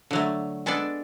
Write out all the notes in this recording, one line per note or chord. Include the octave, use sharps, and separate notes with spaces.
D3 F#3 A3
G#3 B3 D4 A4 D5